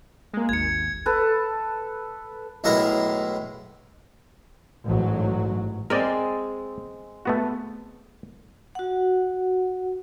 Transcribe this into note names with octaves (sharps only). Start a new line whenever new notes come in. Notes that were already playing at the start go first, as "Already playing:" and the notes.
G#3 A#3
G#1 D#2 G#6 C#7
A4 B4
B1 A2 G#3 E4 A#4 A#5
A1 G#2 F#3
G#3 C4 A#4 D5 D#5
A3 B3 F#4
F#4 F#5